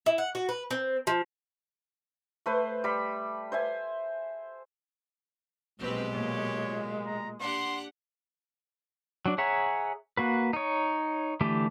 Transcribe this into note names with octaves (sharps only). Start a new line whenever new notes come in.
E4
F#5
F#4
B4
C4
F3
A3 B4 C5
G3 B5
C5 E5 G#5
A#1 B2 F#3 G#3 C4 G4 B4
A#2 C#5
A#5
D4 G4 F#5 C6
F#3 D4
G#4 C#5 E5 F#5 A#5
A#3 F#4 B4
D#4 C#5
D3 E3 A3 G4